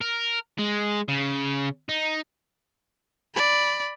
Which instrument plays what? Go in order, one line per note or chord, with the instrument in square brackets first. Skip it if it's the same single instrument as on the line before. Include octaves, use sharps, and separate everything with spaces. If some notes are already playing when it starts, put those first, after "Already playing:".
[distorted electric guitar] A#4
G#3
C#3
D#4
[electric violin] D5 B5